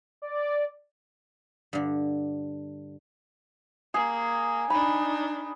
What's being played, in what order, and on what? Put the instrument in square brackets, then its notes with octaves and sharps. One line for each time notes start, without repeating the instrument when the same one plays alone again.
[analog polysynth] D5
[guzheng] G2 D3
[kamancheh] A#3 [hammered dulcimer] G#4
[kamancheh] D4 D#4 [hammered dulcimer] B5